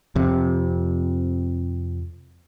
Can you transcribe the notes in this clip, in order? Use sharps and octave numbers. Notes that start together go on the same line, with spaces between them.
F2 C3